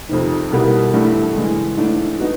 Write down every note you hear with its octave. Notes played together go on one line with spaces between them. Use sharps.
F2 C3 D#3
C2 B2 G3 A#3
G2 E3 A3 D4
C#3 E3 G#3
G#2 E3 A3 D4
B3 D#4 F#4